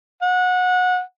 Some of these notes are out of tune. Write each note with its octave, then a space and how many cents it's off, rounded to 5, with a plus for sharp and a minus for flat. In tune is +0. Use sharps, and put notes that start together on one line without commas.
F#5 -25